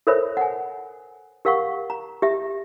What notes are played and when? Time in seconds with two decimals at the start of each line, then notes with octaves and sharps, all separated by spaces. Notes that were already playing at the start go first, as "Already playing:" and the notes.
0.07 A4 A#4 C5 C#5 E5 B5
0.37 F#5 G#5
1.45 G4 A#4 F5 F#5 C#6
1.90 A#5
2.22 G4 E5